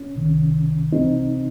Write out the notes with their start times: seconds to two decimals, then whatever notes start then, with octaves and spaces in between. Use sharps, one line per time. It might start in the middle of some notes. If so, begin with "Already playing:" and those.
Already playing: C#4
0.15 C2 C3 D#3
0.93 C#2 C3 E3 C4 D#4